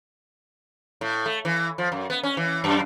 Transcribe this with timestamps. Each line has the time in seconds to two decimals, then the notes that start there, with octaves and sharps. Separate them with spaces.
1.01 A2
1.26 A3
1.45 E3
1.78 F3
1.92 F#2
2.10 B3
2.23 C#4
2.37 E3
2.64 F#2